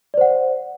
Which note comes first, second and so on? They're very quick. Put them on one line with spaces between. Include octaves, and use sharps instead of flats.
D5 C5 F#5